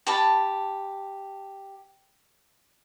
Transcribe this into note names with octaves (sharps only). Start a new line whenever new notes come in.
G4 A5 B5